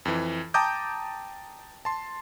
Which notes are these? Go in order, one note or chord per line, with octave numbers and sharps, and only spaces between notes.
F2 E3
G5 A5 A#5 D6 D#6 G6
A5 C6